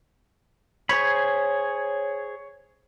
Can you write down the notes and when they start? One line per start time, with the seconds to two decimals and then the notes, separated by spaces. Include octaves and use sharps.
0.89 G#4 C5 C#5 B5